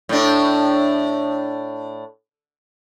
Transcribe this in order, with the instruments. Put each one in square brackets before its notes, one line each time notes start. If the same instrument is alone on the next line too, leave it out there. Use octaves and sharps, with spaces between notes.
[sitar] A2 D4